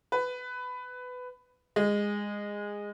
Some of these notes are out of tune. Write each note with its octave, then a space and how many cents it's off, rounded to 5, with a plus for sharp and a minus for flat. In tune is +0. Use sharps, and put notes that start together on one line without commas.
B4 +15
G#3 -15